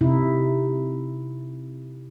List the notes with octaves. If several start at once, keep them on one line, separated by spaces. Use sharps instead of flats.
C3 D#4 E4